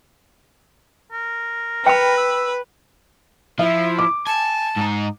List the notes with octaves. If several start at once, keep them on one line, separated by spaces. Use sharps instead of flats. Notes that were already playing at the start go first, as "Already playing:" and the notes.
A#4
B4 G5 B5
E6
F3 E4 E5
D6
G#5 A5
G#2 D#4